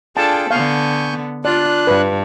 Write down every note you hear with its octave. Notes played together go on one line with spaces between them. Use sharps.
D4 F4 G#4 A4 G5 A5
D3 B3 F5 G#5 C#6 G6
D4 F4 D5 F#6
G2 B4